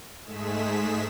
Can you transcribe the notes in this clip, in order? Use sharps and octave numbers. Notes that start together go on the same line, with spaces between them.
G#2 G#3 A3 G#4 B6 E7